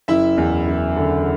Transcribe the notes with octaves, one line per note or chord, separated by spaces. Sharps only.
F#1 E4 E5
E2
F#1
D3